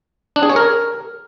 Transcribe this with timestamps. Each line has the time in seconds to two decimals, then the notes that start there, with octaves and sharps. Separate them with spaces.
0.36 D4
0.43 G#4
0.49 C#5
0.56 A#4